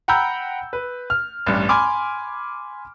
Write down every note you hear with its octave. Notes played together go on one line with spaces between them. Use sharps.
F#5 G5 A#5 B5 E6 G6
B4
F6
A1 G2
G#5 B5 C6 D6 F6